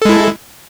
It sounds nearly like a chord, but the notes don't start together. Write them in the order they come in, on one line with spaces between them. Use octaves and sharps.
A4 G#3 E4